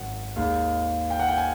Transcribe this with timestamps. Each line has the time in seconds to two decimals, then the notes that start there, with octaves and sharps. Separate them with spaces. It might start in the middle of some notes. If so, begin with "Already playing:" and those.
Already playing: G#1 F#2 F#5
0.36 D#2 D#3 G#3
1.10 G5
1.19 F#5
1.28 G5
1.38 G#5